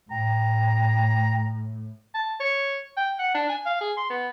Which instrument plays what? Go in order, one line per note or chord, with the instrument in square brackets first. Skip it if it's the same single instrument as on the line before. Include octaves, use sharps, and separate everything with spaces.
[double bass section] A2 [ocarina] G5 [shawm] A#5
[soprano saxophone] A5
C#5
G5
F#5
D4
G#5
F5
G#4
C6
B3